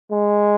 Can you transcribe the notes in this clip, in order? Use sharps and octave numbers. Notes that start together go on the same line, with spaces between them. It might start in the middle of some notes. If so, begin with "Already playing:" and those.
G#3